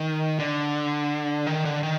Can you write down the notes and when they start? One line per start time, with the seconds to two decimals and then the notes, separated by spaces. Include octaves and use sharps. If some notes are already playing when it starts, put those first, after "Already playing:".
Already playing: D#3
0.40 D3
1.47 D#3
1.65 D3
1.83 D#3